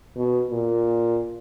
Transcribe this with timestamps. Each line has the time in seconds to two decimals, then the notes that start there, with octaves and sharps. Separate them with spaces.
0.17 B2
0.50 A#2